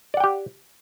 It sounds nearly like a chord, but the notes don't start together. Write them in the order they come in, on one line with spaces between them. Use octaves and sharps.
D5 F#5 G5 G4